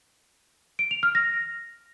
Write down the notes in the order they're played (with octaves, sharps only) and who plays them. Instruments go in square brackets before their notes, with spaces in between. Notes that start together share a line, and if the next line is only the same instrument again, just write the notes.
[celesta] D7
F7
F6
A#6